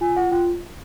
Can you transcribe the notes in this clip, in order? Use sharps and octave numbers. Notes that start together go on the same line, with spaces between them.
F4 G#5
F4 F#5
F4 G5